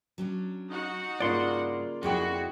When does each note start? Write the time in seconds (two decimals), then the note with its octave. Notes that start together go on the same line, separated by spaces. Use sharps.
0.18 F#3 C#4 D4
0.69 D#4 F#4 F#5
1.20 G2 C#3 A#3 F4 D5 C6
2.03 F2 E4 F#4 G#4 G5